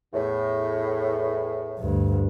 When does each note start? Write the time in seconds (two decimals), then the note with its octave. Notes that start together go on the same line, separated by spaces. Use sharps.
0.14 E2 A2
1.79 D2 G2